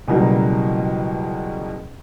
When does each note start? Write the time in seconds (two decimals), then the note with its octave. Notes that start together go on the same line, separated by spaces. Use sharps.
0.08 C#2 B2 E3 F#3 G3 A#3